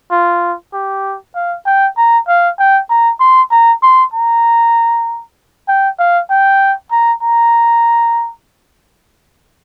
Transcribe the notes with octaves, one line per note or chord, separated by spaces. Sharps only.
F4
G4
F5
G5
A#5
F5
G5
A#5
C6
A#5
C6
A#5
G5
F5
G5
A#5
A#5